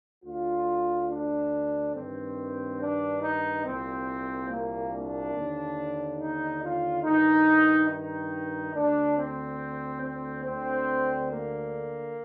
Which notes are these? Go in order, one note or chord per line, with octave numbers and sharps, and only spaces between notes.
D2 D3 F4
D4
G2 D#3 C4
D4
D#4
C2 A#2 C4
A#3
D4
D#2 D3
D#4
F4
G2 D#3 D#4
D#4
D2 D3 D4
C4
C4
D2 D3 C4
A#3